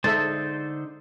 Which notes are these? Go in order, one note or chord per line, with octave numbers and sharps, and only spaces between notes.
D3 G#3 D#4 A4 C5 E5 A6